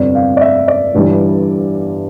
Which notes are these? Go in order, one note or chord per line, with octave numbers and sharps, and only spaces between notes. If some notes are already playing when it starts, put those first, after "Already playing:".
Already playing: G1 F2 C3 D5
F5
D5
E5
D5
G1 G2 E3 G3